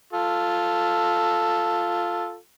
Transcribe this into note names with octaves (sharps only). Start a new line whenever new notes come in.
F4 A4